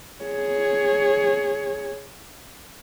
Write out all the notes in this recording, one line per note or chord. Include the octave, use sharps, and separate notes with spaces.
G#4 C#5